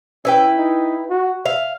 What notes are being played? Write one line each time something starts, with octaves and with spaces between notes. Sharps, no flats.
C#4 E4 B4 G5
D#4
F#4
E5 F5